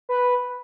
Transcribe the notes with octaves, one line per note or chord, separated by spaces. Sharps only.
B4